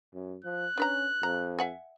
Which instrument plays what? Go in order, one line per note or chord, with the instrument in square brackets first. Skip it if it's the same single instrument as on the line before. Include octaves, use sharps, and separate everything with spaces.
[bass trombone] F#2
[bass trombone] F3 [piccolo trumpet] F#6
[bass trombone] C#4 [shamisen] D4 B4 A#5
[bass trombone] F2 [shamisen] A#5
[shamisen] E5 F#5 G#5